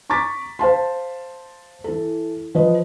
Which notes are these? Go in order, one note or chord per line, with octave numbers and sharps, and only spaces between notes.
A#5 C#6 D6 A6 B6
C5 F5 A5 C6
E3 A4
F3 B4 D#5